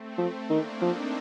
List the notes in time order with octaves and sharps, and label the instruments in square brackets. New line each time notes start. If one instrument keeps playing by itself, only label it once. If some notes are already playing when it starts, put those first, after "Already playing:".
Already playing: [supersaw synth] A3 C4
[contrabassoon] F3
[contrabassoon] D#3 [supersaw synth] A#3 D4
[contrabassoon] F3 [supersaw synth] C4 D#4